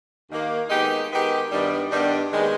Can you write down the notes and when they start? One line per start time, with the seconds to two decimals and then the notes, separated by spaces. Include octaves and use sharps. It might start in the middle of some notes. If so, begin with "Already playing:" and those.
0.30 D#2 D#3 A#3
0.70 D#3 G#3 B3 D#4 G4
1.10 D#3 G#3 B3 D#4 G4
1.50 G2 D#3 G3 B3
1.90 G2 D#3 G3 B3
2.31 D#2 D#3 G#3 B3